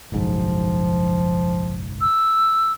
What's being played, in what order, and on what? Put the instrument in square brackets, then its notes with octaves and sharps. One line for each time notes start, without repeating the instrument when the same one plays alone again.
[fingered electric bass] F#1 B1 G#2 [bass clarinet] F3
[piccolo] E6